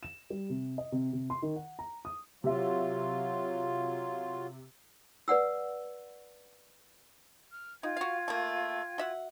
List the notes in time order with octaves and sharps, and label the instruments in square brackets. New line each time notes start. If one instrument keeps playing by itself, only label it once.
[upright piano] E7
G3
C3
D#5
C3
C3
C6
D#3
F#5
A#5
D#6
[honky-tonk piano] C3 E5 [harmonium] F#3 F4
[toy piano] B4 D5 F#5 E6
[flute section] F6
[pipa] D#4 [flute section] F4 G5 G#6
[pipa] F#4 F5
A3 A#3
F#4 E5 F#5